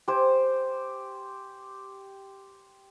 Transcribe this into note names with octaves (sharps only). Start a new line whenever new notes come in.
G4 C5 G#5